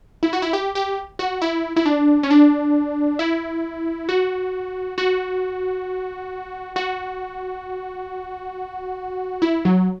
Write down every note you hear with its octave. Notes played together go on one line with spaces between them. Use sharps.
E4
F#4
E4
G4
G4
F#4
E4
E4
D4
C#4
D4
E4
F#4
F#4
F#4
E4
F#3